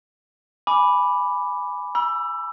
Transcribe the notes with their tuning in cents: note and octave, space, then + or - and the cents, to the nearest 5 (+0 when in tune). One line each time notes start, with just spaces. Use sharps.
G#5 +0 B5 +0 D6 +0
B5 -40 E6 +20